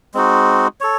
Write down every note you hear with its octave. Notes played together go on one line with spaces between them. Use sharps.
G#3 C4 D#4 F#4
A4 C#5